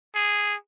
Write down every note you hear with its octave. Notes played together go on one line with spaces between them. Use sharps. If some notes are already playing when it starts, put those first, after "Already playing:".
G#4